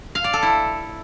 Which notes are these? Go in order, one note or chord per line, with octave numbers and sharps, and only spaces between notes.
F5
D5
A4
E4